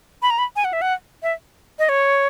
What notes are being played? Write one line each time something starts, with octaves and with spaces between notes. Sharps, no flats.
B5
A#5
B5
G#5
F#5
E5
F#5
E5
D#5
C#5